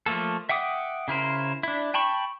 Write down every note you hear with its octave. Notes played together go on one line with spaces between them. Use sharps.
F3 A3 A#3 A4
E5 F#5 G5 D6 D#6
C#3 E4 A#4 C5
D4 E4
G5 A5 B5 C#6